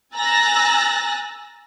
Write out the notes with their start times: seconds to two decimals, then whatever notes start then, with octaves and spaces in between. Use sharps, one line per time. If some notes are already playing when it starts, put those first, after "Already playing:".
0.15 G#5 A#5 E6 F#6 A6 A#6